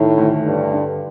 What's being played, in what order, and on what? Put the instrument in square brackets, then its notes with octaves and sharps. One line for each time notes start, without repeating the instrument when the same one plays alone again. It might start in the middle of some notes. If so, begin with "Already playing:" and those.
Already playing: [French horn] A2 [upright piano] D#3
[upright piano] D2
[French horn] G2 [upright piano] A3
[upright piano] D3